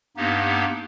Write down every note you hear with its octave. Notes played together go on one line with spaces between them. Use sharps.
G2 A#3 B3 D#4 G4